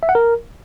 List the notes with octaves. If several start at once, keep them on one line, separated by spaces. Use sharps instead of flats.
E5
F#5
A#4